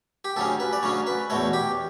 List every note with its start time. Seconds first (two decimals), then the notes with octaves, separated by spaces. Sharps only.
0.25 G4
0.36 D2 C#3 F#3 C#4 A4
0.60 B4
0.73 D5
0.82 D2 C#3 F#3 C#4 C#5
1.07 B4
1.30 E2 B2 A3 C#5
1.53 G4